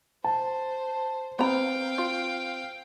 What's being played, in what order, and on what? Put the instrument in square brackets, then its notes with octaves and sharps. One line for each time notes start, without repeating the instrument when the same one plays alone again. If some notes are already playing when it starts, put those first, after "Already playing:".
[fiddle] C5 [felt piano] A5
[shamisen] B3 A#5 [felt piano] C4 [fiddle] F5 G5
[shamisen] F4